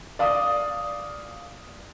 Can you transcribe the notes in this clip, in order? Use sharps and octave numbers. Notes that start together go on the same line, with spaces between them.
D5 F5 D#6